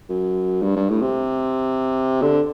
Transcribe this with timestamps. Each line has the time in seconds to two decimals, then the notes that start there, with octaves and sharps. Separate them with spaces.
0.09 F#2
0.62 G2
0.76 G2
0.89 A2
1.02 C3
2.22 D3